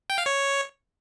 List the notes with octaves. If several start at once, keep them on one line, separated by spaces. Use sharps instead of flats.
G5
F5
C#5